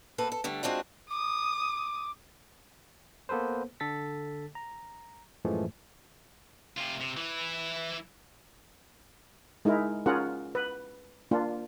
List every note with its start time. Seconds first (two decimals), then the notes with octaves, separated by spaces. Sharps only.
0.18 A#3 C4 A4 B4
0.32 A4
0.44 D3 G3 A3
0.63 G#3 C4 D4 F4 F#4
1.10 D6 D#6
3.29 A#3 B3 A4 B4 C5
3.80 D3 A4 A6 B6
4.55 A#5
5.45 F#2 A2 E3 F3 G#3 A3
6.77 C3 F4
7.00 C3
7.17 E3 E4
9.65 G#3 D#4 E4 A#4
10.06 C#4 F4 G#4 A#4 F#5
10.55 B4
11.31 A#3 D4 F4